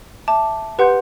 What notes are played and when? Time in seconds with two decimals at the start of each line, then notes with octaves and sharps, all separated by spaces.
0.28 E5 A5 D6
0.79 G4 B4 F#5 C6 G6